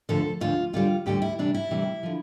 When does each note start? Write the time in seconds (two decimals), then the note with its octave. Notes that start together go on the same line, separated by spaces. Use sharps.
0.09 D2 D3 F3 A4
0.41 D2 D3 F3 F4
0.73 D2 D3 G3 F4
1.06 D2 D3 G3 G4
1.22 E4
1.38 D2 C3 E3 G3 D4
1.54 E4
1.70 D2 C3 E3 G3
2.03 D3 F3